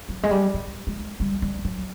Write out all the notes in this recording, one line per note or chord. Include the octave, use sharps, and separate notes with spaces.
F#3
G#3
G3
G3
G#3
G3
G3
F#3